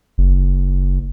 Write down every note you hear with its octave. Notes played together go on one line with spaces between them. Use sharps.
F#1